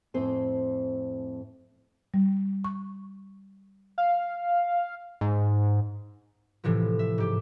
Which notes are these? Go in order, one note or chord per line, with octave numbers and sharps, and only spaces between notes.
F2 A2 C4 C5 G#5
G3
C#6
F5
G#2
A2 C3 E3 F3
E5
G#2 G4